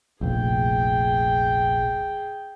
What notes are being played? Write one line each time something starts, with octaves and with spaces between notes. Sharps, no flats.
F1 A#1 G#4 G5